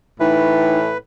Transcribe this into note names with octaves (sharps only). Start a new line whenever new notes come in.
A2 E3 D#4 B4